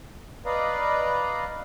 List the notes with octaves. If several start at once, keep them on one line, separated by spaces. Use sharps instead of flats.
B4 D5 D#5 F5 A#5